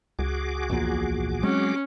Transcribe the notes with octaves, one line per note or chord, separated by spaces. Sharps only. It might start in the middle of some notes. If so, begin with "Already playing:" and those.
C#2 F#4 G#4 D6
A#1 E2 A#2
F#3 G#3 C4 C#4